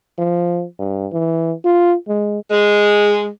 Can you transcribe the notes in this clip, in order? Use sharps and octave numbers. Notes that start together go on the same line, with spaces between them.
F3
G2
E3
F4
G#3
G#3